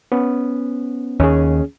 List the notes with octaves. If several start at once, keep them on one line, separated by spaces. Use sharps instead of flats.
B3 C#4
D#2 C#4 G#4